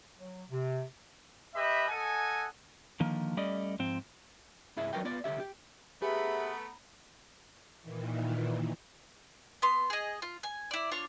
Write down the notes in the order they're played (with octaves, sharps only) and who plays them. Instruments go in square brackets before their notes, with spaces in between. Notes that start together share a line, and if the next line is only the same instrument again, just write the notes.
[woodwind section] F#3
C3
[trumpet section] G4 B4 D#5 E5 B5
A4 D#5 F#5 G#5
[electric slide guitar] D3 D#3 F3 A#3
G3 A3 C#4 D5 D#5
G#2 F3 C4
[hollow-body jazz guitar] C2 G2 E4 G#4 E5
F#3 D4 F#4 A#4 B4 G5
B3 F4 D5
C2 D3 G4 E5
G4
[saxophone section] A3 B3 [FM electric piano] G4 G#4 [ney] E5 [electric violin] A#5 B5
[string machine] A#2 D#3 E3
[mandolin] B3 C6
G#4 D#5
F4
G#5
E4 D5
D4 F4 C#5 C#6